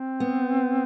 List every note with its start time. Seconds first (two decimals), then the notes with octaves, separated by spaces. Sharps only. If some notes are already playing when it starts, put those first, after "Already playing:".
Already playing: C4
0.20 B3